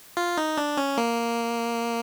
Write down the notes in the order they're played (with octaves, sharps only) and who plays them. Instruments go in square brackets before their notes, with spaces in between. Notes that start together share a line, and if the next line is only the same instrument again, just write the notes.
[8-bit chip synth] F4
D#4
D4
C#4
A#3